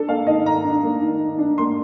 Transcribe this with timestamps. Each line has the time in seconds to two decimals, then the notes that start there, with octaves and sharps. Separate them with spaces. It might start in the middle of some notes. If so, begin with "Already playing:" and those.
Already playing: D4 A4
0.08 A#3 F5
0.27 D#3 D#5
0.46 D#3 A#5
0.65 D4
0.83 A#3
1.01 D#3
1.20 D#3
1.38 D4
1.58 A#3 C6